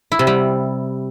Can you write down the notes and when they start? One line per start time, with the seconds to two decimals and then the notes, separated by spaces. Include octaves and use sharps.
0.12 E4
0.19 C3
0.27 G3